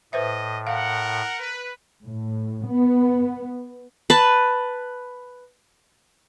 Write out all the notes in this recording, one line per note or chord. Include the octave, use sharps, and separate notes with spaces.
A2 B4 C5 D#5 E5
A#4 F5 F#5
B4
A2
B3
B4 A5